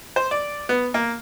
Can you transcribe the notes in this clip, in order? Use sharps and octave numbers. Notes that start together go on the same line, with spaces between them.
C5
D5
B3
A#3